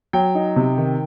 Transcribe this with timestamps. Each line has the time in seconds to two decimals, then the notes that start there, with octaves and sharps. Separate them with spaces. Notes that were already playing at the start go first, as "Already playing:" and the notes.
0.13 F#3 G5
0.35 D#4
0.56 C3
0.78 D#3